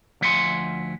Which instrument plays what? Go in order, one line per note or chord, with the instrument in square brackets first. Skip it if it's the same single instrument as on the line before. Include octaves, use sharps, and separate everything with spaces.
[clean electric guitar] D2 F3 E5 F#5 G#5 C6